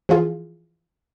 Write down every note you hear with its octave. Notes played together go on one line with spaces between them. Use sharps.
E3 F3 F4 G#4